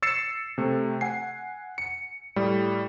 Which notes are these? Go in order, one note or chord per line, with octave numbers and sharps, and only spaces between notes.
E6 A6 C7 C#7 E7
C3 A3
F#5 G#5 C7
C#7
A2 G3